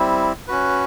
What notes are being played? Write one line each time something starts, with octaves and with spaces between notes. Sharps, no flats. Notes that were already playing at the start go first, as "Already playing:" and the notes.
Already playing: G3 C4 E4
C#4 F#4 B4